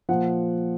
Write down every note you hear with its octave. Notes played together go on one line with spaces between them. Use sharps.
A#2 F3 F#5